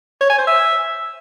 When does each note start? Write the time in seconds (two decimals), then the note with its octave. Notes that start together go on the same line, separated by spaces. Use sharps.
0.21 C#5
0.30 G#5
0.39 C5
0.47 E5